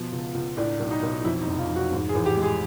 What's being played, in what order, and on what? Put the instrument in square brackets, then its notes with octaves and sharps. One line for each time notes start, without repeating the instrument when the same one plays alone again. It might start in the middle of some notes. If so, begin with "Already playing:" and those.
Already playing: [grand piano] B2 F3
C#2
C#2
A2 D4
B1
D#4
B1
F2 E4
D#4
F1
F4
F1
F#4
G#2
G#4
A1
G4
G#3
G#4